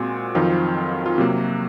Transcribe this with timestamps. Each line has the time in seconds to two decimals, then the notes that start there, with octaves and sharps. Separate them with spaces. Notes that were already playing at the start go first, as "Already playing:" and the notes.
Already playing: A#2 G#3 C4 F#4
0.35 F2 D#3 F#3 C4 F4
1.06 F4
1.18 C3 F#3 A#3 F#4